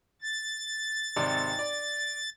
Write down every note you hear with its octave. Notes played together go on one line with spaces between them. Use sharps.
A6
G#1 C3 D5
D5